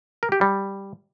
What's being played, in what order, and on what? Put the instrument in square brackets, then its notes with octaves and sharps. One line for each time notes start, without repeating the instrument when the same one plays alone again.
[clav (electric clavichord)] A#4
G4
G3